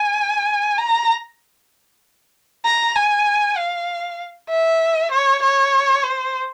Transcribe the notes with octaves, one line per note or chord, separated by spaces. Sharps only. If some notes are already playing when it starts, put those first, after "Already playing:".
Already playing: G#5
A#5
A#5
G#5
F5
E5
C#5
C#5
C5